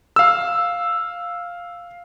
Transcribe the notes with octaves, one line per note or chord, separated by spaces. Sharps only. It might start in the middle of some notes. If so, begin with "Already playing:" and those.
F5 E6